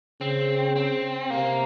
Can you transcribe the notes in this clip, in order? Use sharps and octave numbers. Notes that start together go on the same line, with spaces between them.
C#3 C4
C4
C3 A#3